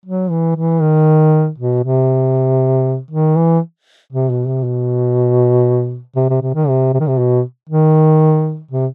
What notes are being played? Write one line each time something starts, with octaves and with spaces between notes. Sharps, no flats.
F#3
E3
E3
D#3
B2
C3
D#3
E3
C3
B2
C3
B2
C3
C3
C3
D#3
C3
C3
D#3
C3
B2
D#3
C3